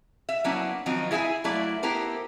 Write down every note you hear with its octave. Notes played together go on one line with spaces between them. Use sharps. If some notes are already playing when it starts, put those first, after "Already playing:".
E5
F#3 A#3 B3 C#4 D4 E4
D#3 F3 F#3 C4 D#4
E4 G#4 E5 F5 G#5
F#3 A3 A#3 E4 D5
B3 E4 G4 A4 A#4 C5